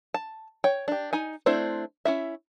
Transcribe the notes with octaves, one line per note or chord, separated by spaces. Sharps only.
A5
C#5 G5
D4 G4
D#4 G#5
A3 C4 D4 E4 C5
C#4 E4 E5